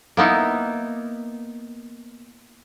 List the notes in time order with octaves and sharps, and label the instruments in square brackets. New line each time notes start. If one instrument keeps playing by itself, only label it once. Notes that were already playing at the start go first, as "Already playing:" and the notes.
[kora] A#3 B3 D#4 E4